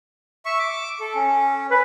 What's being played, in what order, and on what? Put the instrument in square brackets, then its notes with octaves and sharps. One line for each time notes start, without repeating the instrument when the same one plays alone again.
[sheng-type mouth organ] E5 C#6
D6
A4
C#4
[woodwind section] B4